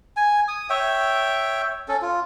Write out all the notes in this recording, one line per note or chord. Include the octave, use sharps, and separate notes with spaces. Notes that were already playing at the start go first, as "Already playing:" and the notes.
G#5
D#6
C#5 E5 G5
C#4 A4
F4